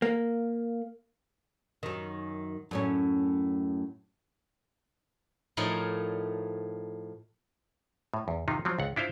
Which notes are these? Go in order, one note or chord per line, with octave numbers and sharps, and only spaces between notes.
A#3
F#2 D#3
F#2 A2 C#4
A2 F3 A3 D#4 A#4 C#5
A2
E2
C3 D#3 D#4 F4
F3 F#3 C4
C#2 F#5
D4 E4 F4 C5 F5